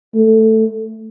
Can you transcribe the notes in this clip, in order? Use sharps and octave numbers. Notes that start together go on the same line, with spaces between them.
A3